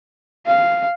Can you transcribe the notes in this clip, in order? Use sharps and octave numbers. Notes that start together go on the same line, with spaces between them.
F5